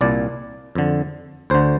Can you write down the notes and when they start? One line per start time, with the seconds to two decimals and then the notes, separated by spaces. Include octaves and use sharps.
0.01 C2 A#2 D5
0.75 F2 D3
1.50 D2 D3 C5